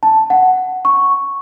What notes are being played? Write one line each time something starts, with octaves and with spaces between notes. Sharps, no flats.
A5
F#5
C#6